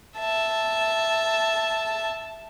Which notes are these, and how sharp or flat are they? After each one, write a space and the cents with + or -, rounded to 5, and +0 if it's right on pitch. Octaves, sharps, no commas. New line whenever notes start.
E5 +0 A5 +0